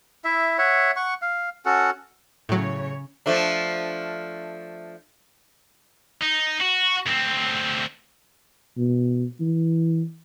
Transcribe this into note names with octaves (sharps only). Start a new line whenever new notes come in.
E4 E5
C#5 E5 F#5
F#5 C#6
F5
C#4 F#4 A4 F#5
A2 C#3 F#3 C#5
F3 A3 D4
D#4
F#4
D2 C4
B2
E3